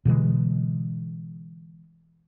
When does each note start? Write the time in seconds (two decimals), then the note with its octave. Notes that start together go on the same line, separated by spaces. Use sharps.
0.05 B2 D3 E3 G#3